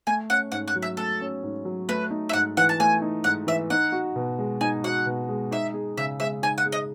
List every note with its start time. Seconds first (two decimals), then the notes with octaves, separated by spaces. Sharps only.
0.07 A3 G#5
0.30 C#4 F#5
0.52 G#2 F#5
0.68 F#5
0.75 F#3
0.82 E5
0.97 A3 A4
1.21 C#4
1.43 G#2
1.65 F#3
1.89 A3 B4
2.11 D#4
2.29 E5
2.33 G#2 F#5
2.57 E3 F#5
2.69 A5
2.80 A3 G#5
3.02 D#4
3.24 G#2 F#5
3.47 E3 E5
3.70 D#4 F#5
3.92 F#4
4.16 B2
4.39 G#3
4.61 D#4 G#5
4.84 F#4 F#5
5.06 B2
5.29 G#3
5.51 D#4 E5
5.74 G#4
5.97 C#3 E5
6.20 G#3 E5
6.42 D#4 G#5
6.58 F#5
6.66 G#4
6.72 D#5